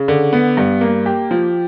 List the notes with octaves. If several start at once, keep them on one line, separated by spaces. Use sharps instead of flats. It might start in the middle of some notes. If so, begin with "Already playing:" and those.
Already playing: C#3
D3
B3
G2
A#3
G4
F3